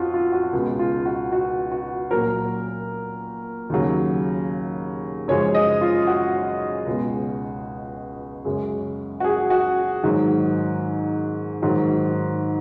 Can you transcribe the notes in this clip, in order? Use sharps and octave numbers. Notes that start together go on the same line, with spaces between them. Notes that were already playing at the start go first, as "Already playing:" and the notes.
Already playing: F2 F4 F#4
F4
F#4
C#2 B2 G#3
F4
F#4
F#4
F#4
A#2 F#3 A#4
D#2 C#3 F#3
F#2 C#3 F3 G#3 C#5
D#5
F4
F#4
C#2 B2 G#3
F#2 C#3 G#3
F#4
G#4
F#4
G#2 D#3 F#3
G#2 D#3 F#3